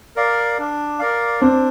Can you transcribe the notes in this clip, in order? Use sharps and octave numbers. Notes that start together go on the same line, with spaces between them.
A#4 D5 F5
D4
A#4 D5 F5
C4 D4